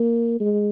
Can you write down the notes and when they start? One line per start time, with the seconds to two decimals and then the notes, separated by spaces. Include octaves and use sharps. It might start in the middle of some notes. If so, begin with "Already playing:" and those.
Already playing: A#3
0.40 G#3